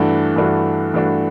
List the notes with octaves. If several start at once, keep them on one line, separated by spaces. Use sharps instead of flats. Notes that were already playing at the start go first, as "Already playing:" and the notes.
Already playing: G2 E3 A3 D4 F#4
G2 E3 A3 D4 F#4
G2 E3 A3 D4 F#4